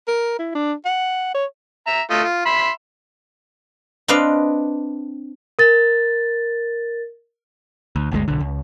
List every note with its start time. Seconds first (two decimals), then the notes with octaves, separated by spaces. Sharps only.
0.08 A#4
0.39 E4
0.55 D4
0.85 F#5
1.34 C#5
1.87 E5 A#5
2.10 A3 F4 D#5
2.24 F4
2.46 E5 B5 C6
4.08 C4 D4 B4 D#5 F5
5.59 A#4 A6
7.96 D2
8.12 G1 D2 D3 G#3
8.28 B1 D3
8.40 C#2